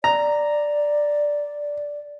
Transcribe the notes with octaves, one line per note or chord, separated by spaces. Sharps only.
D5 A#5